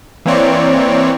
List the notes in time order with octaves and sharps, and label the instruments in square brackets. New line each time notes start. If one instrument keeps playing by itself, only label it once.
[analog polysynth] E3 A#3 C4 C#5 D5